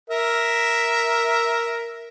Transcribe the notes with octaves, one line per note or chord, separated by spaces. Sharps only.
A#4 E5